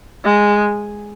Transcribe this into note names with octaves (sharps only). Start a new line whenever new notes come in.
G#3